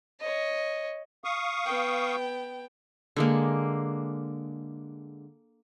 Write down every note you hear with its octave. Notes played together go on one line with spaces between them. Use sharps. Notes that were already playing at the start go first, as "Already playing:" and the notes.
C#5 D#5
F5 C#6 D#6
B3 G5
D3 G#3 A#3